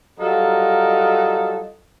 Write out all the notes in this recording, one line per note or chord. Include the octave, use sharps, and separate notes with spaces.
F#3 G3 F4 A4 A#4 D#5